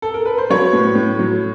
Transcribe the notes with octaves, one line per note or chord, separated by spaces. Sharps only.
A4
A#4
B4
C5
F#3 B4 C#5
A2
A2
F#3